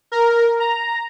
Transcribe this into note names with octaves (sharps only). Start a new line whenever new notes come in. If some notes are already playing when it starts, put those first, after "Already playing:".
A#4
A#5